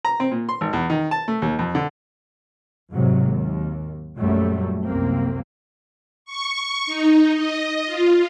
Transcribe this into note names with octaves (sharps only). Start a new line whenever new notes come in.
A#5
C4
A#2
C6
G#1
E2
D#3
A5
A3
D#2
F2
D3
F2 G#2 C3 F#3
D#2
A#1 F#2 F#3 G3 A3
C2 F#2 A#3 C4
C#6
D#4
D#5
F4